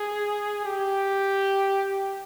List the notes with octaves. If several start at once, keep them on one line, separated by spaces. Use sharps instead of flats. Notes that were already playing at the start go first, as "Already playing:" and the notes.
Already playing: G#4
G4